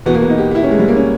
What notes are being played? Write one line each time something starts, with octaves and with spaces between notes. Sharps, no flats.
E2 B2 B3
A#3
B3
D#4
G4
G4
E4
C#4
G#3
G3
A#3
C#4